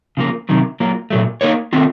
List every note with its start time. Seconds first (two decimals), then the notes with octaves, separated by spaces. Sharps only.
0.17 C#3 F3 A#3
0.49 C3 D#3 F#3
0.80 F#3 A#3 F4
1.10 A#2 F#3 A3
1.41 A#3 D#4 A#4 C#5
1.73 D#3 A3 C4 F4